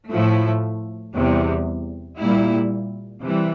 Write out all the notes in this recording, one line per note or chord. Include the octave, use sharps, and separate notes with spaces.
A2 F3 A3 E4
E2 C3 G3
A#2 G3 A#3 E4
C3 E3 G3